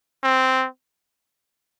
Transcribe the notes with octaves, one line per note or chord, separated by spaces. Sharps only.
C4